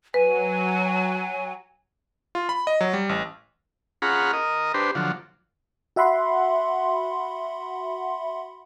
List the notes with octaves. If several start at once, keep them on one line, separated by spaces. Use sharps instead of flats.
F#3 B4 G#5
F4
B5
D#5
F#3
G3
A1
C#4 F4 G#4 F#5 A#5 B5
A#4 D#5
D4 G4 B4 C5
D3 F3 F#3
F#4 E5 F#5 B5 C6